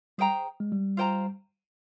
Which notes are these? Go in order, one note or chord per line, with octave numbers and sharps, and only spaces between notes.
G3 G#4 C5 G5 A#5
G#3
G3
F4 C5 G5 A#5